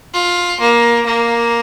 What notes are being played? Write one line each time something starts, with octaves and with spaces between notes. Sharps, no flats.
F4
A#3
A#3